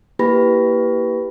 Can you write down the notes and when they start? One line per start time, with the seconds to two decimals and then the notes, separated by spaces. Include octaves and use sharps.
0.19 A#3 E4 G4 B4 B5 A#6